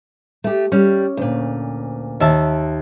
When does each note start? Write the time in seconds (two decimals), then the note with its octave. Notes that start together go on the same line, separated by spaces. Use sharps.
0.44 A3 G4
0.72 G3 C#4
1.17 D2 A#2
2.20 D#2 E5 A5